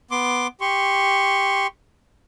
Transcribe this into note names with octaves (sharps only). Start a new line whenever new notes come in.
B3 C6 D6
G4 C6 C#6